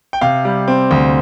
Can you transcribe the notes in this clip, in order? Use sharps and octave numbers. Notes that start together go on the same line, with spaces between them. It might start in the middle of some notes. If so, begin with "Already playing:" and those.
G5
C3 F5
G3
C4
D2